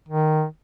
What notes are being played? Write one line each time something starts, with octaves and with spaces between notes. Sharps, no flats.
D#3